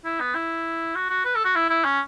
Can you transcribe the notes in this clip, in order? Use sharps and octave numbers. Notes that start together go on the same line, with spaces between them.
E4
B3
E4
F#4
F#4
B4
A4
F#4
E4
E4
C#4